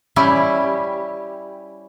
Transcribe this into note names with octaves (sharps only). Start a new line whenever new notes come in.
G3 C#4 E4 G4